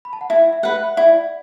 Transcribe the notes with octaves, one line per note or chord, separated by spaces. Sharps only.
B5
A5
F#5
E4 E5
E5
B4 F#5
E5
E4 D5 F#5